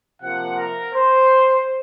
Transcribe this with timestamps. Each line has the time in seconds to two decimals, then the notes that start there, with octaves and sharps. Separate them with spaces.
0.22 C3 F3 A#3 F#5
0.57 A#4
0.93 C5